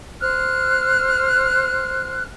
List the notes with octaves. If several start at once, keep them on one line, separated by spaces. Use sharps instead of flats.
C5 F6 F#6